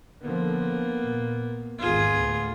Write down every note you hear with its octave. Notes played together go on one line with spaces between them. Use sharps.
D3 F3 A#3 B3
A#2
G#1 E2 G2 F4 G#4
D2 A2 B3